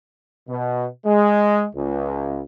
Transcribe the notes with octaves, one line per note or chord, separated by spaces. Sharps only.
B2
G#3
C#2